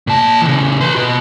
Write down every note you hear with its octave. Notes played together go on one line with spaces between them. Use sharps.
A#2 A5
C#3 E3
B4 C6
B2 F#4